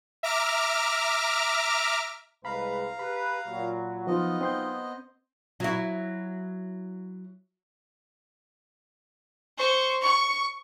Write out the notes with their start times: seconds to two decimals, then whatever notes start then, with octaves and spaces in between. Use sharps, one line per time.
0.23 E5 A#5 D6 F6
2.45 C2 G#3 B4 F5 A#5 B5
2.99 G4 B4 B5
3.47 A#2 F#3
4.07 F3 F#3 B3 D#4 F4 D#5
4.41 C4 C6 G6
5.60 F#3 E4
9.57 C5 C#6
10.04 C#6